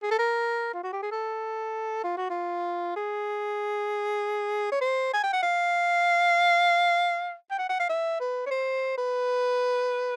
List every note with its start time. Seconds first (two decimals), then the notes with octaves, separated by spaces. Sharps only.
0.03 G#4
0.11 A4
0.19 A#4
0.74 F4
0.84 F#4
0.93 G4
1.02 G#4
1.11 A4
2.04 F4
2.17 F#4
2.30 F4
2.96 G#4
4.72 C#5
4.81 C5
5.14 G#5
5.24 G5
5.33 F#5
5.43 F5
7.51 G5
7.58 F#5
7.69 F#5
7.79 F5
7.89 E5
8.20 B4
8.46 C#5
8.51 C5
8.98 B4